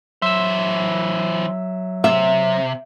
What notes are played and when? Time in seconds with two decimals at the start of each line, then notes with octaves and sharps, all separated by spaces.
0.22 E3 F#3 C5 E5 E6
2.04 C3 E5